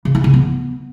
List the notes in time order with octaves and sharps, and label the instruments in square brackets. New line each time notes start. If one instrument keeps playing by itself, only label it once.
[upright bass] C#3
E4
C#3
B3